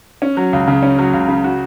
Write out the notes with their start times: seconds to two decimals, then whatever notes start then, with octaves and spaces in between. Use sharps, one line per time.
0.22 C#4
0.37 F#3
0.53 C#2
0.68 C#3
0.83 C#4
0.99 F#3
1.13 C#2
1.28 C#3
1.44 F#4